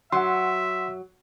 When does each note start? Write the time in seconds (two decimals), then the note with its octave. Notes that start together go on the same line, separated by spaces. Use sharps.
0.12 F#3 E5 F#5 C6